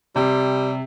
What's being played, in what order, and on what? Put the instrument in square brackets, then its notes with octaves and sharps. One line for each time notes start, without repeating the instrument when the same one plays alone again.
[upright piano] C3 [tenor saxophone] G3